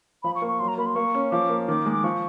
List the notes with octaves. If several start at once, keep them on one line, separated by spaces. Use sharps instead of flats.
F3 B5
C#6
A#3
C#6
F#3 C6
A#5
A#3 B5
C6
A#3 C#6
C#4
F3 D6
A#3
D#3 D6
G#3
D6
F3 C#6